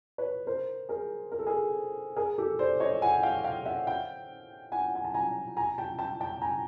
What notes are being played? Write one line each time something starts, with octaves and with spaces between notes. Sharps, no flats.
B4 C#5
A#4 C5
G#4 A#4
A#4
A4
G#4 A#4
G#4 A#4
G4 A4
C5 D5
C#5 D#5
F#5 G#5
F5 G5
F5 G5
E5 F#5
F5 G5
F#5 G#5
G#5
A5
G#5 A#5
G#5 A#5
G5 A5
G5 A5
G5 A5
G#5 A#5